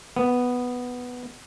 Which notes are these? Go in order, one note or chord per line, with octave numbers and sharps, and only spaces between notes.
B3